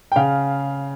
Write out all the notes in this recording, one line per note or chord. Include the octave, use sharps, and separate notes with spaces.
G5
C#3 F5